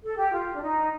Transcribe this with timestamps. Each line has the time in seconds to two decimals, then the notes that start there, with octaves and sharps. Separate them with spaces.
0.03 A4
0.17 G4
0.32 F4
0.54 D4
0.61 D#4